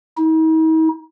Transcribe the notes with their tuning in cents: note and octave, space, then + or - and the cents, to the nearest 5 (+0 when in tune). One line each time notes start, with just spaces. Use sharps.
D#4 +45